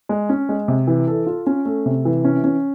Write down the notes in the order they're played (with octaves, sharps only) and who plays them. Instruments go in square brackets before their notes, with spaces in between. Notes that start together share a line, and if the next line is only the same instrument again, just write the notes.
[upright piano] G#3
C#4
G#3
C3
E3
A4
F4
C#4
A3
C3
E3
C#4
C#4